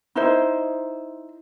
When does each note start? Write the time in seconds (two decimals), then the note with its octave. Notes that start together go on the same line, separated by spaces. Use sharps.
0.16 D#4 E4 C5